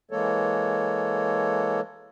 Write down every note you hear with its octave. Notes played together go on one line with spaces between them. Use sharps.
E3 G#3 A#3 A4 C#5